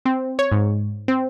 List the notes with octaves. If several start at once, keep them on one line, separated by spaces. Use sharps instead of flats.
C4
C#5
G#2
C4